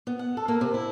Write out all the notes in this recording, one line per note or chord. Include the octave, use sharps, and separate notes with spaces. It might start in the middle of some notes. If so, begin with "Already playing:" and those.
B3
F#5
A4
A#3
C3
E4